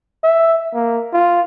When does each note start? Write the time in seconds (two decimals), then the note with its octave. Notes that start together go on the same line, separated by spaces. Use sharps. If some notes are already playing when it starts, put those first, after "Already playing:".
0.24 E5
0.74 A#3
1.13 F4